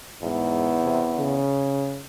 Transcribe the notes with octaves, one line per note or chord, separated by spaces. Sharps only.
E2 G#2
C3
C#3